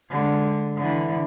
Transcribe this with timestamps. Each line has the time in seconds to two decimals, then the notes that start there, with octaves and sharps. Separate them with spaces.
0.10 D3 G#3
0.77 D3 E3